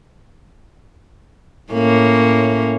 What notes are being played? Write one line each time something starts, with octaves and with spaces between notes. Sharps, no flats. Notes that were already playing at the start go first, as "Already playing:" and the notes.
A2 A#3 C#4